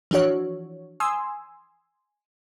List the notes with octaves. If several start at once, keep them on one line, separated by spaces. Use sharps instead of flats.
E3 F3 D4 F#4 C#5
G#5 C6 D#6 E6